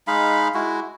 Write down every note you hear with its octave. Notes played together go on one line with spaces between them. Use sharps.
G#3 D#4 F5 B5
G#3 E4 F#4